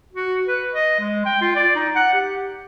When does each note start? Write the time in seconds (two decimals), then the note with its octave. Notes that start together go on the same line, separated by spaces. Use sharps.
0.13 F#4
0.47 B4
0.74 D#5
1.00 G#3
1.25 G5
1.41 F4
1.56 D5
1.75 D#4
1.95 F#5
2.14 G4